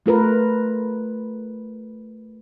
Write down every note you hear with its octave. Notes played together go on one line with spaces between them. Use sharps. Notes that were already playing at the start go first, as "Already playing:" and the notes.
A3 F4 A#4 B4